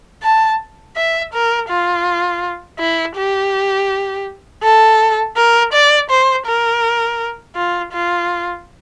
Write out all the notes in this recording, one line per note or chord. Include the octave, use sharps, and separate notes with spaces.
A5
E5
A#4
F4
E4
G4
A4
A#4
D5
C5
A#4
F4
F4